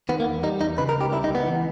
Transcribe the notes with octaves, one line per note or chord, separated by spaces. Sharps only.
D#3 B3
A#3
E2
G3 D#4
E2 D#4
C#3 B4
A#4
C#2
G4
G3 E4
D#4
C#2
B3
E3